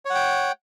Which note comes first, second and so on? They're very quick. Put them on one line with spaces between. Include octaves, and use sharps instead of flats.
C#5 F#5 G5